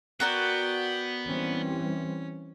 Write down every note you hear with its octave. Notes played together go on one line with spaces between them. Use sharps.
B3 F#4 A#4 D5 G5
E3 G3 C4 C#4